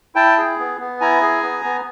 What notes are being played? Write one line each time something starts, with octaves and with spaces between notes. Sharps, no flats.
E4 G5 A5
G#4
B3
B3
E4 G#5 A#5
G#4
B3
B3